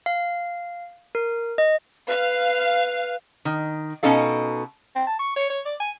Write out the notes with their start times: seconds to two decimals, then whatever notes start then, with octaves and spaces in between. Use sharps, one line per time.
0.06 F5
1.15 A#4
1.58 D#5
2.08 B4 F5
3.45 D#3
4.03 B2 C#4 D#4 A4 F5
4.95 C4
5.07 A5
5.19 C#6
5.36 C#5
5.50 C#5
5.65 D5
5.80 G#5